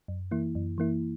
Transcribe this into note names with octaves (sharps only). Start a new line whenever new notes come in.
F#2
E3 A#3 E4
F#2
E3 A#3 E4